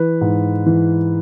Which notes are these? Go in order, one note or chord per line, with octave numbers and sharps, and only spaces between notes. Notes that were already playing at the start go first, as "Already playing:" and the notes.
Already playing: E3 B4
G#2
E3